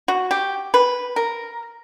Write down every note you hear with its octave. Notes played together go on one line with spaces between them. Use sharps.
F#4
G4
B4
A#4